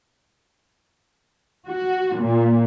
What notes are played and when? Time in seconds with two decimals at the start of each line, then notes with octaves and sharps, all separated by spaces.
1.66 F#4
2.18 A#2